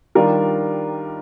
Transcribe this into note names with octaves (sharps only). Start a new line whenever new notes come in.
D#3 G3 D4 F4 A#4